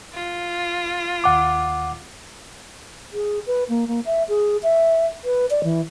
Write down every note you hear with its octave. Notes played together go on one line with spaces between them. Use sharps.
F4
D#2 F#5 D6
G#4
B4
A#3
A#3
E5
G#4
E5
B4
D5
E3